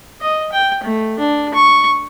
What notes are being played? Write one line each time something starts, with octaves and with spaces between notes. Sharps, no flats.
D#5
G5
A3
D4
C#6